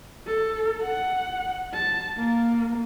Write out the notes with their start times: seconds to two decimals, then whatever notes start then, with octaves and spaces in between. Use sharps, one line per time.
0.27 A4
0.83 F#5
1.74 A5
2.18 A#3